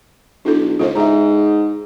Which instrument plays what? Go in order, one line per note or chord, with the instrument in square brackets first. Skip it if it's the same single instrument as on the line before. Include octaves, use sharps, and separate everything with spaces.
[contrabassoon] B1 [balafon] D4 E4 A4
[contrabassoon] C#2 [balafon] F4 A4 C5
[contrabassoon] G#2 [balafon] E5 A#5